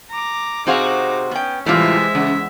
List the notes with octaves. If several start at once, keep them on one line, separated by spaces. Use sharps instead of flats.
A#5 D6
C3 C4 D#4 F#4 G#4 C5 F5 D6
B3 C#4 G5
A2 C3 E3 G3 G#3 F4 E5
E2 C#3